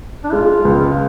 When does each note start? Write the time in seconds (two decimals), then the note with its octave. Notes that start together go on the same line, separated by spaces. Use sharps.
0.24 D4
0.32 G#3 F4
0.65 C#2